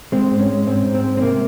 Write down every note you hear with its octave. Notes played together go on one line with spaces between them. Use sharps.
G#3 C4
G#2
C#4
G#3
G#2 C4
G#2
C4
G#3
C4
C3 A#3